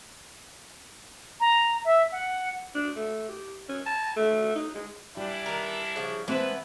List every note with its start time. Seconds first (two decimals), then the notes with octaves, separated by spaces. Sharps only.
1.40 A#5
1.85 E5
2.12 F#5
2.75 D4
2.96 A3
3.29 G4
3.69 C#4
3.86 A5
4.16 A3
4.55 D#4
4.75 G#3
5.17 E3 G3 D4 E4
5.46 D#3 A#4
5.96 C#3 F3
6.28 E3 G#3 B3 C4 B4 A5